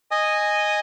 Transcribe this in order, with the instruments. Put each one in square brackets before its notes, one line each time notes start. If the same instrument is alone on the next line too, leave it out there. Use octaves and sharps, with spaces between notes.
[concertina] D#5 G#5 D#6